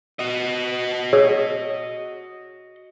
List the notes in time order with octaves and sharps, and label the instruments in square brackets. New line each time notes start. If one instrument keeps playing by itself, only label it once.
[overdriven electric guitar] F#4 D#5
[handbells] G#4 C#5 E6